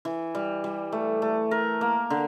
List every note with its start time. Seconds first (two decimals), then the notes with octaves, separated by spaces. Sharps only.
0.05 E3
0.35 G3
0.64 G3
0.92 A3
1.22 A3
1.51 A#4
1.81 A#3
2.10 D3